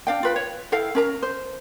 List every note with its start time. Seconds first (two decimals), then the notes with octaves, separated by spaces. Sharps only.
0.07 D4 F5 G5
0.23 F4 B4 G5
0.36 C#5
0.72 E4 A4 F5 G5
0.95 C#4 A#4 A#5
1.23 C5